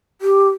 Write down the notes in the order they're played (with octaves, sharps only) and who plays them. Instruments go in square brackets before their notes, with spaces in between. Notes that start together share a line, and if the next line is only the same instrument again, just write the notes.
[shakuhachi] G4